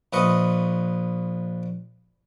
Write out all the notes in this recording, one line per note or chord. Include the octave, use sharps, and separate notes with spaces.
A#1 B4 D#5 C#6